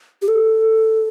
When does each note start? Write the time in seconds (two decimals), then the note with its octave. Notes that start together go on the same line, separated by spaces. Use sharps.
0.22 G4
0.28 A4